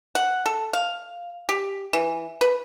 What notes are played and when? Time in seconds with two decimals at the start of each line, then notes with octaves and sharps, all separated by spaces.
0.15 F#5
0.46 A4
0.73 F5
1.49 G4
1.93 E3
2.41 B4